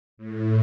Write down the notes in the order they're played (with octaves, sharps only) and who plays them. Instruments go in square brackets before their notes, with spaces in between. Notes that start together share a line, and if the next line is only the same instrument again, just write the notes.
[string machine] A2